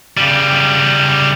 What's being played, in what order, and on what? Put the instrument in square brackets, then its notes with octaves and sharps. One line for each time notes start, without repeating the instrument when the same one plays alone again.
[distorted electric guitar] C#3 G3